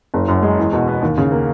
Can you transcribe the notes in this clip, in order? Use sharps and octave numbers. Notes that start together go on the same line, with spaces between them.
F#1
F#2
G#3
E2
B2
B3
D#2
C#3
A#3